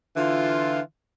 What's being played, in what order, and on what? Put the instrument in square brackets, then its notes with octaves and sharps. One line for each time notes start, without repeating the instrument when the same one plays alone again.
[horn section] D3 E3 F4